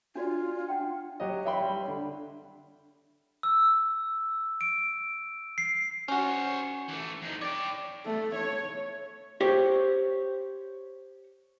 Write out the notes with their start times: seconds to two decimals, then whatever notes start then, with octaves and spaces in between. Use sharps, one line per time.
0.15 D4 F4 F#4 D5
0.68 D4 F#5 G5
1.20 F#3 G4 C#5 D#5
1.46 C#5 E5 G5 B5 C6
1.59 G3 B5
1.88 D3
3.43 E6
4.61 D7
5.58 C7
6.08 C#4 F#4 C5 C#5
6.88 E3 A3
7.22 F2 D#4
7.41 C#5 D5 G5
8.06 A3
8.36 C#5
9.41 G4 C5 C#5